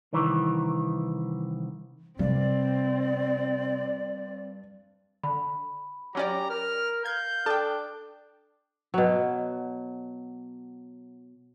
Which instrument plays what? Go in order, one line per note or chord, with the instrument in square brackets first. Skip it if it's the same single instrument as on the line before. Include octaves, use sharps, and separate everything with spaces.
[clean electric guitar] C2 D#3 E3
[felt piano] G2 [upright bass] C3 [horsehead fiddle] C4 [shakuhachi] D5
[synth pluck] D3 [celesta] B5
[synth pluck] F#3 C#4 D5 [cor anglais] G4 [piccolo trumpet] A#5
[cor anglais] A#4 [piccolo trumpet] F6
[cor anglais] F5 [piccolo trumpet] G6 [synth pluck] G#6
[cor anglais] D4 [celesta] A4 [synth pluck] G5 A5
[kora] B2 F#3